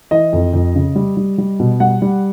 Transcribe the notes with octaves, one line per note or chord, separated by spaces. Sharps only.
E3 D#5
F2
F2
C#3
G3
G3
G3
B2
G3 F#5
G3